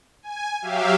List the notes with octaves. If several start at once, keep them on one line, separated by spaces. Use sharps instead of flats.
G#5
F#3 G4 E5 F5